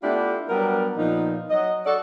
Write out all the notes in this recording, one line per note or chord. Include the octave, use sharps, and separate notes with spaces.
A3 B3 D4 E4 F4 G4
F#3 G3 B3 D4 A#4
A#2 F3 B3 D#4
F#3 D#5
F#4 A4 D5